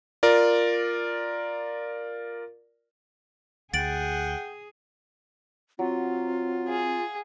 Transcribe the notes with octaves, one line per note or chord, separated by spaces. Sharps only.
F4 A#4 D5
D2 G#4 F#5 G5 A6 D7 F#7
F#3 C4 F4
G#4 F5